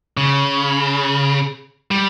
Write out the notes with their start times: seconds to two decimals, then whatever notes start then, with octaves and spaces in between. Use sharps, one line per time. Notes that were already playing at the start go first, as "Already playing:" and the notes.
0.17 C#3
1.91 G3